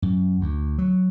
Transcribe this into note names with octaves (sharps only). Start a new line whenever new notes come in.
F#2
D2
F#3